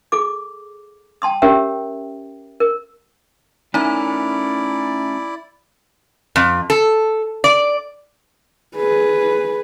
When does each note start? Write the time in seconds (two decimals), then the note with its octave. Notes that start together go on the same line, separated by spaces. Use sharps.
0.12 G#4 A4 D6
1.22 G5 A5 C6 D#6
1.42 C#4 G4 A#4 C#5 E5 G5
2.60 A#4
3.74 A3 C#4 D#4 E4 A#4 D5 A#5
6.36 F2
6.70 A4
7.44 D5
8.77 G#4 B4